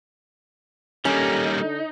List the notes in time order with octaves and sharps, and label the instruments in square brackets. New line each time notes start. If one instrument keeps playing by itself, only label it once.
[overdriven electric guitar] G3 A#3 [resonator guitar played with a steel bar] C#4 [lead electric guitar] D#4 [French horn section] G4 A4
[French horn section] D3